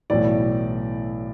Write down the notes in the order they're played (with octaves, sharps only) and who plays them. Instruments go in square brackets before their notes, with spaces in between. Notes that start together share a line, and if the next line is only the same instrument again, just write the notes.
[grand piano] B1 A2 E3 D5